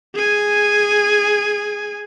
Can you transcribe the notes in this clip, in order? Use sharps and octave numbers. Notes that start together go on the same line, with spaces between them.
G#4 G#5